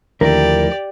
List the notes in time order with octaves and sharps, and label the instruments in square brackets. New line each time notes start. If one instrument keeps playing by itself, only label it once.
[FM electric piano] D#2 D3 [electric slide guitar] F3 A3 E4 [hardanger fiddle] G4 D5 [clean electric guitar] A#4